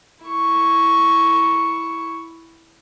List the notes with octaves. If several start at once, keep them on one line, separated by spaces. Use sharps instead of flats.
E4 C#6